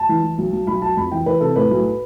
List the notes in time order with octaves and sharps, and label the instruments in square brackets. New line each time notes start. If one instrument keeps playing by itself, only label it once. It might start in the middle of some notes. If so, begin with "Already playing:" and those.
Already playing: [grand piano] A5
E3
E3
B1
B1
B1 B5
B1 A5
F2 B5
E3 G5
E3 B4
C3 A4
A2 B4
B1